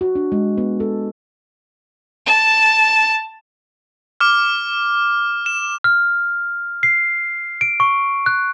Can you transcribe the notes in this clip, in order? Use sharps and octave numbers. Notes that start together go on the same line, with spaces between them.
F#4
D4
G#3
B3
A4
A5
D6 F6
E7
F6
C7
D7
C#6
F#6